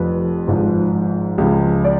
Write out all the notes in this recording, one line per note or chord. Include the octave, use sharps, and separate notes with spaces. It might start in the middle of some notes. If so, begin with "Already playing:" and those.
Already playing: F1 F2 F3 B4
G#1 G#2 F3
C#2 C#3 F3
D5